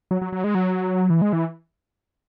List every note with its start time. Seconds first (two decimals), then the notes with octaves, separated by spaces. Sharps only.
0.11 F#3
0.21 F#3
0.32 F#3
0.44 G#3
0.55 F#3
1.10 E3
1.22 G#3
1.33 E3